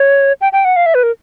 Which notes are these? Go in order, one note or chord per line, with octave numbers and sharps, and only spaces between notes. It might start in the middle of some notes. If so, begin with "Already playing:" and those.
Already playing: C#5
G5
G5
F#5
F5
E5
B4
A#4